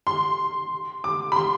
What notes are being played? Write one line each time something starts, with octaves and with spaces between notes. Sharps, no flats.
C6
D6
B5
C6